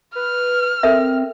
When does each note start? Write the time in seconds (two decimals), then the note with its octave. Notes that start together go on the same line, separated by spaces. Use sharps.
0.15 B4 F6
0.83 C4 A4 A#4 E5